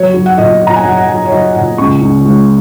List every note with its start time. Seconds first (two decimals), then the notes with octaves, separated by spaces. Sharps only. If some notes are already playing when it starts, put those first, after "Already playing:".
Already playing: F#3 C#5
0.14 F#3
0.26 F#5
0.38 A#2 D#5
0.62 A#2
0.67 A#5
0.76 G#5
0.85 F#3 F#5
0.97 F#5
1.08 F#3 G#5
1.26 C#5
1.32 F#3 D#5
1.55 A#2 F#5
1.78 C#2 C#6
2.02 C#2
2.25 G#3